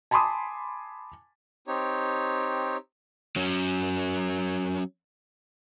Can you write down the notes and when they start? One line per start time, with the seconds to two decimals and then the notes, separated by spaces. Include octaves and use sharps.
0.11 G#5 A5 B5 C6 D6 D#6
1.68 C4 D#4 G4 C#5
3.36 F#3 C#4